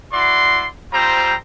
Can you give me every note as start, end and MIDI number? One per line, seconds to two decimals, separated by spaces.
0.12 0.67 64
0.12 0.67 66
0.12 0.67 74
0.12 0.67 84
0.92 1.34 55
0.92 1.34 60
0.92 1.34 65
0.92 1.34 72
0.92 1.34 82